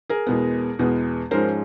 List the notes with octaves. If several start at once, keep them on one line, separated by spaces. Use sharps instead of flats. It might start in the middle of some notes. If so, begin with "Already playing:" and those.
G#4 A#4
E2 B2 G#3 B3
E2 B2 G#3 B3
G#2 F3 G#3 C#4 A#4 C5